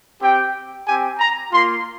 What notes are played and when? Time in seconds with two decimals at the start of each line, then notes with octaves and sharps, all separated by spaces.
0.20 C4 G4 G5
0.86 C4 G4 G#5
1.19 A#5
1.52 A#3 F4 C6